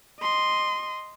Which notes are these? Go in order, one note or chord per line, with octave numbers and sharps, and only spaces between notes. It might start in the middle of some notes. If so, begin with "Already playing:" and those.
D#5 C6